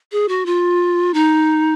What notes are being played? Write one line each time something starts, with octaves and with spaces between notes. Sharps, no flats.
G#4
F#4
F4
D#4